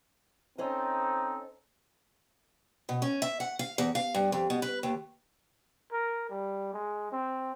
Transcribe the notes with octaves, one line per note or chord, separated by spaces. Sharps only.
C4 C#4 D#4 A4 C5 D#5
B2
C#4
E5
F#5
F5
E2
F5
G2
F2
B2
B4
D#2
A#4
G3
G#3
C4